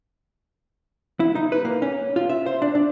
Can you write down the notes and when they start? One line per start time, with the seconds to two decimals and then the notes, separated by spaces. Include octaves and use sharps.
1.20 E4
1.35 D#4
1.52 B4
1.65 A#3
1.82 C#4
2.16 F4
2.29 E5
2.46 C5
2.62 D4
2.75 D4